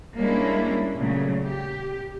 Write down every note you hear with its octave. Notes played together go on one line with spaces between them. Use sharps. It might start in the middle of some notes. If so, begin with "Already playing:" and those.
G3 G#3 A#3 C#4 D4 E4
A#2 C#3 F#3 A3
G4